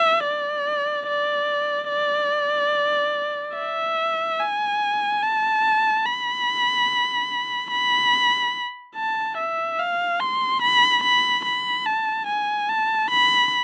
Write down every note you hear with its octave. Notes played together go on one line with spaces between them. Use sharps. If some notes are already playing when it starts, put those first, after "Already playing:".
Already playing: E5
D5
D5
D5
E5
G#5
A5
B5
B5
A5
E5
F5
C6
B5
B5
B5
A5
G#5
A5
B5